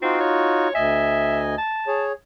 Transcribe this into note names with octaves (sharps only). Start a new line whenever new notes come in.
C4 D#4 F4 F#4
C#5
D2 D#5 E5 G#5
A5
G#4 C#5